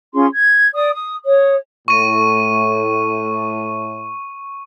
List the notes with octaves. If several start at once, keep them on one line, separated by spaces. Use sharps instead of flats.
C#4 F4 G#4 C6
G#6
D5 D#6
D#6
C#5 D#6
A2 C#6 D#7